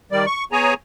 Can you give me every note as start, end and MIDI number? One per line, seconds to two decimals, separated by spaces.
0.12 0.26 51
0.12 0.26 55
0.12 0.26 74
0.26 0.45 85
0.52 0.74 59
0.52 0.74 68
0.52 0.74 73
0.52 0.74 80
0.52 0.74 82